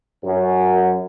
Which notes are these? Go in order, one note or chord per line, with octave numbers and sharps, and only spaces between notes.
F#2